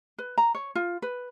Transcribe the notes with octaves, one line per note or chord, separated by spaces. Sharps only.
B4
A#5
C#5
F4
B4